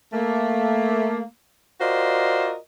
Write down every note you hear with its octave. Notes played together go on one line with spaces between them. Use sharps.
A3 A#3
F4 F#4 A#4 C5 D5 D#5